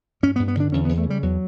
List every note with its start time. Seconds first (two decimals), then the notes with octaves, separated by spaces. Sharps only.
0.23 G2 C#4
0.36 B3
0.39 G2
0.48 B3
0.57 D3 D4
0.72 E2 C#4
0.85 E2 B3
0.98 A3
1.06 C#3 G3
1.22 E2 F#3